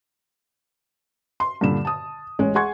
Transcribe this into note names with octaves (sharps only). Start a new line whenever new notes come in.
C6
G2 A#2 D3 B5 E7
A5 D#6
A1 G#3 C#5
G#4 F#5 G#5 C6 C#6 G#6